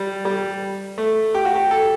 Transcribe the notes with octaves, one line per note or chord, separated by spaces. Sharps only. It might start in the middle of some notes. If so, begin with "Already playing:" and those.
Already playing: G3
G3
A3
G4
F#4
G4
A4